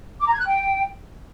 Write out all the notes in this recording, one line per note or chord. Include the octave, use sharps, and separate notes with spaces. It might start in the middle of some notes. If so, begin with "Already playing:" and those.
D6
A#5
G#6
F#6
G5